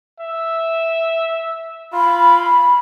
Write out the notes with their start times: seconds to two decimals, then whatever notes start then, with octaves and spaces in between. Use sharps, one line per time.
0.20 E5
1.93 F4 B5